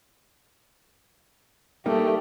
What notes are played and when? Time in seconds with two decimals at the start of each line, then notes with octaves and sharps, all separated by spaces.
1.86 G3 A3 A#3 D#4 G4